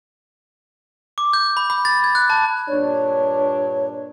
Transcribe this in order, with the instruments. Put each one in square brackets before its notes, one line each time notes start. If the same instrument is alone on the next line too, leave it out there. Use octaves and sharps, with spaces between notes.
[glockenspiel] D6
G6
B5
B5
A6
G#6
F#6
A5
[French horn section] G2 A#2 D4 [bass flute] C#5